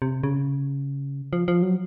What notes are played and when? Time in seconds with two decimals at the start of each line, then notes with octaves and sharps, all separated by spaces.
0.02 C3
0.23 C#3
1.33 F3
1.48 F3
1.62 F#3